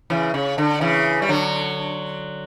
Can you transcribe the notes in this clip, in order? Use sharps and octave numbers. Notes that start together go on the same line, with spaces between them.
C#3 E3
C#3
D3
C#3 E3
G3
D3 F#3